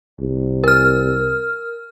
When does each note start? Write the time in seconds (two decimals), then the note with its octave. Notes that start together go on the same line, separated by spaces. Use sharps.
0.20 C2
0.64 A#4 F6